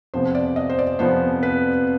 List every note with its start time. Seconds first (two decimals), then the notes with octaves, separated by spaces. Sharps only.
0.14 F2 C3 F3 B3 C5
0.35 D5
0.56 D#5
0.70 C5
0.79 D5
0.99 F2 C3 F3 B3 C5
1.43 B4